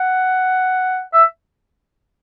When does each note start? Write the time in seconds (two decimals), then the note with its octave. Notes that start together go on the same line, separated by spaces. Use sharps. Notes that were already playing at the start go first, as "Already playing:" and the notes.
Already playing: F#5
1.14 E5